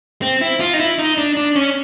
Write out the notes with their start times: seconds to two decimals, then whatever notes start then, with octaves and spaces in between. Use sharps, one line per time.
0.22 C4
0.41 E4
0.60 F4
0.74 D#4
0.80 E4
0.99 D#4
1.18 D4
1.37 D4
1.56 C#4